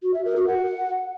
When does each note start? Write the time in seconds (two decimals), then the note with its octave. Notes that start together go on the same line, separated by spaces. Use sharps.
0.03 F#4
0.14 E5
0.25 A#4
0.36 F#4
0.47 F#5